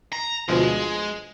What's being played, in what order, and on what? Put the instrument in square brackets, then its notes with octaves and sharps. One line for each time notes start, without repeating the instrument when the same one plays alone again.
[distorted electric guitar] A#5
[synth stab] D2 B2 F3 [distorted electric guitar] G#3